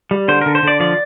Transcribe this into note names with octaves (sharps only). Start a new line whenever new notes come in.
G3
D3 C5
D3 A#4
C5
D3 D5
F3 D5